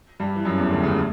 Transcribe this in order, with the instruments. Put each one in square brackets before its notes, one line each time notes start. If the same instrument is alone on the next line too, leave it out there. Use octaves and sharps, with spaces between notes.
[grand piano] G2 G3
E3
F#2 F#3
E2 E3
D2 D3
C#2 C#3
A2